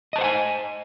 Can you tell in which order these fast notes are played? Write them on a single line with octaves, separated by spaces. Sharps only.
D#5 A5 C5 F#5 G#5